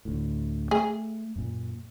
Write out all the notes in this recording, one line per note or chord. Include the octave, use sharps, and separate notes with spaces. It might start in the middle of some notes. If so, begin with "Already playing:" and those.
D2 A2
A3 G#4
F#2 A#2